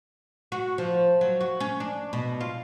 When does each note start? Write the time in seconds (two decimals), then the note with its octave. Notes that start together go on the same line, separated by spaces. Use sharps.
0.52 F#4
0.78 F3
1.21 F#3
1.41 F#4
1.60 C#4
1.80 D4
2.13 B2
2.40 F4